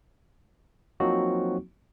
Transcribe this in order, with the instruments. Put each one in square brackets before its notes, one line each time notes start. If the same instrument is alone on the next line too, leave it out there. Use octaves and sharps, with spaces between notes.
[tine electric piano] F3 F#3 A#3 C4 D#4 F#4